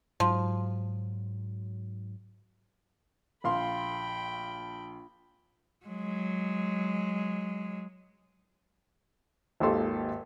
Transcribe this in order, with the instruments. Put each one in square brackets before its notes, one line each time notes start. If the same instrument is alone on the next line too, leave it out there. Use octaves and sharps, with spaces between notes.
[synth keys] G#2 F#3 [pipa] F3
[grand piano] A#1 F5 C6 [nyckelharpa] G5 B5
[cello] F#3 G#3
[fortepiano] G#1 D#2 F4 G4 A4 C6